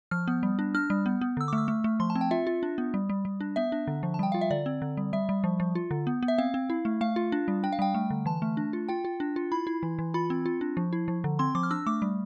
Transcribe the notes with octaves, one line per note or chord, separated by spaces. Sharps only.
F3 F6
B3
G3
D4
D4 F6
G3
B3
B3
D3 E6
D6
A3
E6
A3
A3
F3 C6
A5
C4
G5
F4 E5
F4
D4
B3
G3
G3
G3
D4
B3 E5
D4
D3
F3
A5
G3 G5
F4 F5
E5
D3 D5
C4
D3
G3
G3 E5
G3
F3
F3
F4
D3
B3
B3
E5
C4 F5
C4
E4
A3
A3 F5
F4
D4
G3
D4 G5
F5
G3 G5
A3
D3
E3 A5
A3
D4
F4
F4 G5
F4
D4
F4
E4 B5
E4
E3
E3
F4 B5
C4
F4
D4
F3
E4
F3
D3
C4 C6
F3 D6
F6
D4 E6
A3 D6
G3